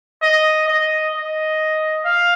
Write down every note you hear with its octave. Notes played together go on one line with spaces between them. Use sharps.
D#5
D#5
D#5
F5